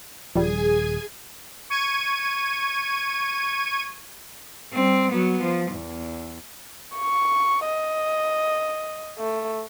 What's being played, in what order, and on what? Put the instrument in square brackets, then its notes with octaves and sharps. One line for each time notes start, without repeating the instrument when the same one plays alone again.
[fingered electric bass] D#1 [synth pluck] F3 G3 [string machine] G#4 G#5
[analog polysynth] C#6 G#6 D#7
[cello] G3 C4
F#3 B3
F3
E2
[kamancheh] C#6
D#5
A3